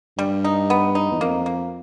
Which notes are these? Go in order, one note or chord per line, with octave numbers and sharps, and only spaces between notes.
G2 G3
D#4
B3
D#4
E2
F2 A#3
A#3